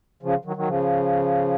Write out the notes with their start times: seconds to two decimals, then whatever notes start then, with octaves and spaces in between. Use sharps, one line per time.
0.23 C#3 F3
0.45 D#3 F#3
0.56 D#3 F#3
0.67 C#3 F3